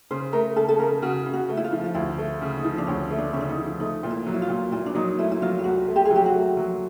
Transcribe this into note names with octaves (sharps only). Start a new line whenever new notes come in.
C#3 C5
A3 A#4
C#3 A4
A4
C#3 A#4
C#3 F#4
C#3
F#4
A3
E4
F4
F3
F4
D2 E4
A3
C#3
D#4
F3
D4
D2 C#4
A3
D4
C#3 C#4
D4
D#4
F3
A3 D#4
A#2
E4
F#3
E4
F4
A#2
A#2 E4
D4
F#3 D#4
A3 E4
E4
F#3 F4
F4
C2 F#4
A3
G4
G#4
F#3 G4
F#4
A3
F#3